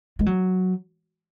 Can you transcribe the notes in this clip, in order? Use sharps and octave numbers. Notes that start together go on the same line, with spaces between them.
G#3
F#3